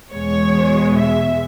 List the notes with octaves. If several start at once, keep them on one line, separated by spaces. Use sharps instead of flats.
E2 B2 G#3 C#5
E5